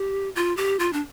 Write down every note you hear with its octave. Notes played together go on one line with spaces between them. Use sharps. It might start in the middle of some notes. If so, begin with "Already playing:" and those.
Already playing: G4
F4
G4
F4
D4